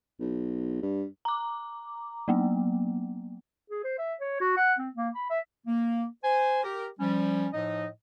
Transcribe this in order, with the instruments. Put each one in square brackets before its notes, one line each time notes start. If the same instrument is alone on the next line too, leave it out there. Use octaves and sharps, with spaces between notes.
[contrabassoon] B1
G2
[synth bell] A#5 D6
F#3 A#3 B3
[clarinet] G#4
C5
E5
C#5
F#4
F#5
C4
A#3
B5
E5
[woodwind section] A#3
C5 G#5
G4 A#4
F3 G3 C#4
A2 F3 D#4 D#5